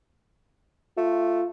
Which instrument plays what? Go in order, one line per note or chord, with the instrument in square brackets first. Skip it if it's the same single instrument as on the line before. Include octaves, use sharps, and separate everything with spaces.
[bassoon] A3 [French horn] F4